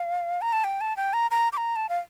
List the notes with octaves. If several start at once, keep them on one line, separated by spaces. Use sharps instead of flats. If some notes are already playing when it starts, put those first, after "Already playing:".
Already playing: F5
A#5
A5
G5
A5
G5
A#5
A#5
D6
A#5
A5
F5